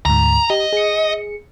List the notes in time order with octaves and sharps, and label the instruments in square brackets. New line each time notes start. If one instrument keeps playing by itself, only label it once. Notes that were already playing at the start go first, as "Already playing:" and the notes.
[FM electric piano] D2 G#2 [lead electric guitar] A#5
[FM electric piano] G4 [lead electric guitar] D#5
[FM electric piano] G#4 C#7